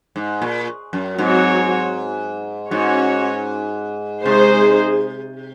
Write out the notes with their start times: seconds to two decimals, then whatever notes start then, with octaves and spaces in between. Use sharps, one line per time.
0.16 G#2
0.42 A#2
0.93 F#2
1.18 G#2 F#3 C4 F#4 C#5
2.71 G#2 C#4 F#4 C#5
4.25 C3 G#3 D#4 G#4 C5